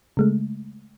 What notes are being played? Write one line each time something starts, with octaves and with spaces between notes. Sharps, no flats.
C#3 G#3 A3